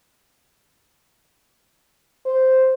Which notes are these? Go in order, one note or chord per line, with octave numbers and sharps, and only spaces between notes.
C5